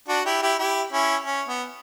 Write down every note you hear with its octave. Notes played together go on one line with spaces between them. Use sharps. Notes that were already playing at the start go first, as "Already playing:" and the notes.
D4 F#4
E4 G4
E4 G4
E4 G4
C#4 E4
C#4
B3